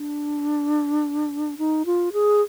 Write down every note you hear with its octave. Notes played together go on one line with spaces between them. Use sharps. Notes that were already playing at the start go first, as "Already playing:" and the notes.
Already playing: D4
D#4
F4
G#4